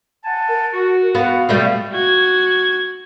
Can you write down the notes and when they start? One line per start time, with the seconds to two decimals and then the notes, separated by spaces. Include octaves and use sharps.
0.24 F#5 G#5 A5
0.49 A#4
0.73 F#4
1.15 B3 F5
1.49 B2 G3 A3
1.92 F#4 G#6